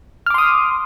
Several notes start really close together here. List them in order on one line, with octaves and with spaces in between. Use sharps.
F6 D6 C6 D#6